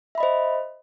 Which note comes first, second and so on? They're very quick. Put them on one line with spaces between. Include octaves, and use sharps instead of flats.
E5 B5 D#5 C5